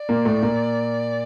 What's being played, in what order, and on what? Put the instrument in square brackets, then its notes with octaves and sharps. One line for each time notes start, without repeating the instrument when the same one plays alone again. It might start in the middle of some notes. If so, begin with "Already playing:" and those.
Already playing: [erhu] D5
[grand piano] A#2 A#3
A2 A3
A#2 A#3